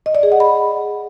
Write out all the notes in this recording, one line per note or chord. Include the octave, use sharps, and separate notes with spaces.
D#5
D5
G#4
F#5
B5